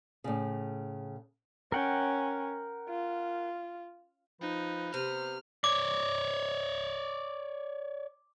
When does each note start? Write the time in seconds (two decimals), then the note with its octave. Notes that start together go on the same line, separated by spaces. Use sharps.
0.24 A2 C#3
1.72 C#4 A#4 F#5 G5
2.89 F4
4.41 F3 D#4 B4
4.94 C3 B3 C5 F6
5.64 C#5 D5 D6